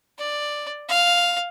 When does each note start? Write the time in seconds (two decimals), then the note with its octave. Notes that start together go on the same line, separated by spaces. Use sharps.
0.18 D5
0.89 F5